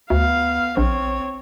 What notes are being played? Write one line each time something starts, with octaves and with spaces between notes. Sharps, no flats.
D2 B3 F5
A#1 C4 C#5